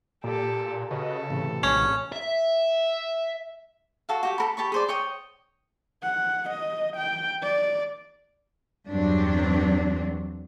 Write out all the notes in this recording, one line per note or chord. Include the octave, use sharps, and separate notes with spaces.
A#2 G4 A4
C#3 F#4 A4 B4 D#5
A2 C3 E3
A#1 C#4
E5
F#4 A4 F5
F#4 G4 G5
A4 A#4 B5
G4 A5 B5 C#6
G#4 C5 D5
C#5 G5 D#6
F#5
D#5
G5
D5
E2 G2 F#3 C4 D4